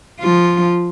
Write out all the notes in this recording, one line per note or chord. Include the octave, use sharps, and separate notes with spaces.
F3 F4